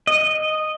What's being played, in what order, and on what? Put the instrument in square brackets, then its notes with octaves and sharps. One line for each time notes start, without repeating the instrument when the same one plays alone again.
[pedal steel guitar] D#5